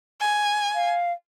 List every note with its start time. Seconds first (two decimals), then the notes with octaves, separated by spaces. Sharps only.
0.21 G#5
0.75 F5